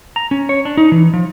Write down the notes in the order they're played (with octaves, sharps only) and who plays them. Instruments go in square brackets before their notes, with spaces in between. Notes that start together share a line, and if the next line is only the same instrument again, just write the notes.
[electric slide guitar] A#5
C#4
C#5
D4
D#4
E3
F3